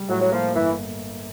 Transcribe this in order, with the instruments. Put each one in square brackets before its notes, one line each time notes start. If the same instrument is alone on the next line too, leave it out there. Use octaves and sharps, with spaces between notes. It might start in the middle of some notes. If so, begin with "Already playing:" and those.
Already playing: [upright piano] G3
[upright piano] A2 [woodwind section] F#3
[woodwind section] F#3
[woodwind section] F3 [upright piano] A#3
[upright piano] G1 [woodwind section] E3